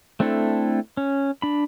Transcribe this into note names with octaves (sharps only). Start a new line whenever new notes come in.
A3 C4 D4 E4 A4
C#4
D4 B5